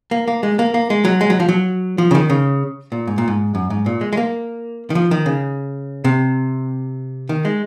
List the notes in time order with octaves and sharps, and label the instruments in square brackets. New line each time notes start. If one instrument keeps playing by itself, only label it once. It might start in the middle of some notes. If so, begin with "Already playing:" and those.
[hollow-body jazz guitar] A#3
A#3
G#3
A#3
A#3
G#3
F#3
G#3
F#3
F3
F#3
F3
C#3
D#3
C#3
A#2
G#2
A#2
G#2
F#2
G#2
A#2
G#3
G#3
A#3
D#3
F3
D#3
C#3
C3
D#3
G#3